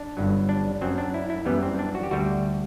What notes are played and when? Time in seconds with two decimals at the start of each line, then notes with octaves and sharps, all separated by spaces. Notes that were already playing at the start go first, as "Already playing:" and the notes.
Already playing: D4
0.17 G1 G2 F#3
0.49 D4
0.81 F#2 F#3 C4
0.98 D4
1.14 E4
1.30 E4
1.46 F#2 E3 G3 B3
1.63 C4
1.79 D4
1.95 F#4
2.03 G4
2.11 D2 D3 G3 F#4